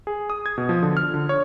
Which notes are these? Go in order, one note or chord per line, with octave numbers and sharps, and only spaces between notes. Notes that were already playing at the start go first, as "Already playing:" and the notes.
G#4
D#6
G#6
B2
F3
D3
F6
D3
C#5